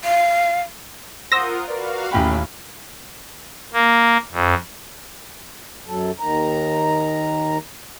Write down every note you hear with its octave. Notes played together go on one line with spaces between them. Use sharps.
F5
F4 A#4 C5 F#5 C6 D#6 E6 A#6
F#4 A#4 B4 D5 F5
A1 D#2 A2 C#4 F5 G5 B5
A#3
F2
F#2 F#3 A4
D#2 D#3 A#5